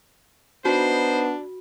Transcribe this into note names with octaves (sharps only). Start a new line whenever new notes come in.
B3 D4 D#4 F#4 C5